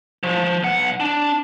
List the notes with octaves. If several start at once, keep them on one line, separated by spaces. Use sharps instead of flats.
F3
B1 F#5
D4